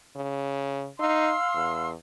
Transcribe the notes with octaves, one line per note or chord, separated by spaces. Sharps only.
C#3
D#4 F5 C6 E6
E2